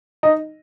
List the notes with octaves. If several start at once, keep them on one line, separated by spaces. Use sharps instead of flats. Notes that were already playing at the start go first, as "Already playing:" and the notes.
D#4 D#5